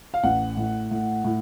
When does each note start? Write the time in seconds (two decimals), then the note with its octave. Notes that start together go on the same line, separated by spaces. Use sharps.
0.14 F5
0.23 A1 F#5
0.57 A2
0.91 A2
1.24 A2